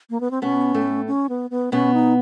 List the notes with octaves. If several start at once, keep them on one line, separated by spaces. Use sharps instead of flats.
A#3
B3
C4
B2 B3 C#4
A2 A3
C#4
B3
B3
B2 B3 C#4
D#4